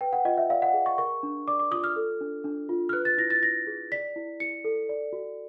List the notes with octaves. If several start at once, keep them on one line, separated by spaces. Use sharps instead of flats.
B4 G5
F#5
F4 D#5
E5
D5 F5
F#5
G#4
C#6
A#4 C#6
D4
D5 D6
D6
F4 D#6
F6
A4
D4
D4
F4
F6
B4 F#6
A6
E4 A#6
A6
E4 A#6
G#4
D5 B6
E4
E4 C#7
A4
D5
F#4